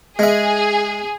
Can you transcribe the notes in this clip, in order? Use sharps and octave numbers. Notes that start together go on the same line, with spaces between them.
G#3 G#4 E5